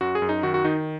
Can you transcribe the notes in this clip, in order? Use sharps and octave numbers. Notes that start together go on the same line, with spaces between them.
F#2 F#4
G#4
F#2
D#4
D#3 F#4
F#4
D#3 D#4